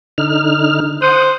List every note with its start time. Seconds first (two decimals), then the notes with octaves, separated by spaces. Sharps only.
0.18 D3 D#4 F6
1.02 C5 F#5 D#6